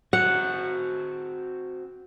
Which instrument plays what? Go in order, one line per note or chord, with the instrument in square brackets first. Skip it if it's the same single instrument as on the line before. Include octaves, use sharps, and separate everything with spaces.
[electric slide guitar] C4 F#4 [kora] F#5